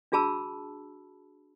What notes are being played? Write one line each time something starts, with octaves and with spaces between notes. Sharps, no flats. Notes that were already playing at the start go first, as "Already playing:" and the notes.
D4 F#4 G#4 A5 B5 E6